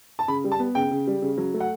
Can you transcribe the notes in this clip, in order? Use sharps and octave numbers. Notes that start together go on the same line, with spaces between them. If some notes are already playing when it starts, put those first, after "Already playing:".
A5
C#3 B5
G3
A5
B3
C#3 G5
C#3
G3
C#3
F#3
A3
F#5